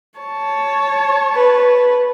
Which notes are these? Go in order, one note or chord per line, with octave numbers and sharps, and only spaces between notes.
C#5 A5
B4